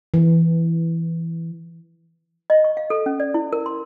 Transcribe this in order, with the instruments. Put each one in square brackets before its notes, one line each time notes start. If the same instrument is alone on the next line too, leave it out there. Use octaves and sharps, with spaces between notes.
[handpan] E3
[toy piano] D#5
C#6
F5
A4
C#4
D5
E4
A#4
C6